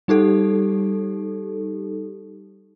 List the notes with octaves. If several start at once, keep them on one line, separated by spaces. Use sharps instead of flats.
G3 D#4 G4 A4